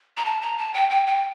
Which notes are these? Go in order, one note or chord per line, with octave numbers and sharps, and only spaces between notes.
A#5
A5
A#5
A5
G5
G5
G5